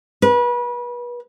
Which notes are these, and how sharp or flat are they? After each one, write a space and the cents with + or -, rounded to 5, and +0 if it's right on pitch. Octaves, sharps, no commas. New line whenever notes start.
B4 -30